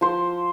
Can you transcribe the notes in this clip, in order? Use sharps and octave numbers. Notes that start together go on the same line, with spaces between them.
F3 C5